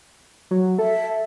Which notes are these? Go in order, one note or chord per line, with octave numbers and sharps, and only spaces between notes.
F#3
A4 E5